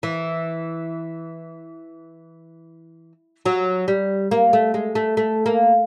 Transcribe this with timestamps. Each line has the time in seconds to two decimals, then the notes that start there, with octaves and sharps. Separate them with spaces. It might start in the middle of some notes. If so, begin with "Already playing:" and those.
0.03 E3
3.46 F#3
3.88 G3
4.31 A#3
4.53 A3
4.74 G#3
4.95 A3
5.17 A3
5.46 A#3